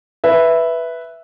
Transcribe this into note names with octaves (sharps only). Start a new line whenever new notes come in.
B4 E5